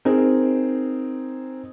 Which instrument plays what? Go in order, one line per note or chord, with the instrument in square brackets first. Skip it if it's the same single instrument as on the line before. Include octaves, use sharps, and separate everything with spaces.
[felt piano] C4 D#4 G#4 A#4